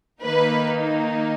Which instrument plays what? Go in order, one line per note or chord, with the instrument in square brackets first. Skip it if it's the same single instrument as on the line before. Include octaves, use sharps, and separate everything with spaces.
[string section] D#3 A#3 D#4 B4